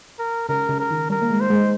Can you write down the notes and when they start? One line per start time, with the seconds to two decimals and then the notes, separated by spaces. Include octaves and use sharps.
0.19 A#4
0.49 C#3 A#4
0.69 C#3
0.80 A#4
0.90 D#3
1.10 G3 A#4
1.22 A#3
1.30 G#3
1.41 C5
1.50 G#3